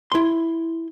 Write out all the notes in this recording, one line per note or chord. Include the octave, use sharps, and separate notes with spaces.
E4 C6